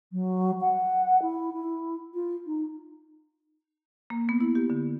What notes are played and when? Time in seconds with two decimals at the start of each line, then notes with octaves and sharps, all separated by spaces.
0.12 F#3
0.61 F#5
1.22 E4
1.53 E4
2.14 F4
2.47 D#4
4.10 A#3
4.29 B3
4.40 E4
4.55 G4
4.70 D3